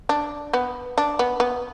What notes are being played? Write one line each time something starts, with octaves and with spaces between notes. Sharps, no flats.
D4
B3
D4
B3
B3